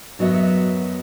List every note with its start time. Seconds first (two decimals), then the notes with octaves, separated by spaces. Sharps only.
0.19 F#2 F#3 B3 D#5 E5